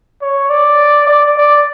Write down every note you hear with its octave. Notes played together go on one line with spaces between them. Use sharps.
C#5
D5
D5
D5